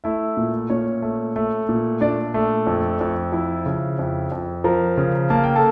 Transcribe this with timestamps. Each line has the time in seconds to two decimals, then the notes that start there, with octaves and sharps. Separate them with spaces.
0.04 A3 E4 E5
0.37 A#2
0.70 A#2 C#4 C#5
1.02 A3
1.36 A3
1.69 A#2
2.01 A#2 D4 D5
2.34 A3
2.67 F2
3.01 F2
3.32 F3 E4 E5
3.66 C#3
3.99 F2
4.32 F2
4.64 F3 A#4 A#5
4.98 C#3
5.30 A#3 A5
5.44 G5
5.56 A4 A5